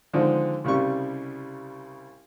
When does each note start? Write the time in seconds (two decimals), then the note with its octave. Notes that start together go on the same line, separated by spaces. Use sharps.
0.14 D3 D#3 F3 G#3 C4
0.64 C2 C#3 G3 C#6